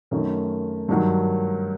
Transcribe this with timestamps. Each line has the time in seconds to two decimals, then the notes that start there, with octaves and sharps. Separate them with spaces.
0.11 F#2 D#3 A3
0.88 G2 D#3 F#3